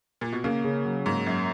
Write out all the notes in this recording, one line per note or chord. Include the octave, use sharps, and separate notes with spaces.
A#2
B2
C#3 A#3
C#3
F#3
G#2 A#3
F#2 F#3